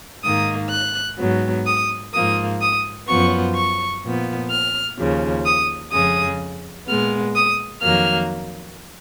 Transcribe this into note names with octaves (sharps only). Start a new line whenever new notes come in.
G#2 D#3 A#3 D#6
F#6
G#2 F#3 B3
D#6
G#2 F3 A#3 D#6
D#6
F#2 F3 B3 C#6
C#6
A#2 F3 B3
F6
D#2 C#3 F3
D#6
F2 C#3 G#3 D#6
A#2 G#3 B3 F6
D#6
F2 D#3 F#3 A#3 F6